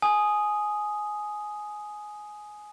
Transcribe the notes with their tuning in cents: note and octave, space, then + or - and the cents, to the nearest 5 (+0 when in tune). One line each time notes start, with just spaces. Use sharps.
G#5 +15 D#6 +0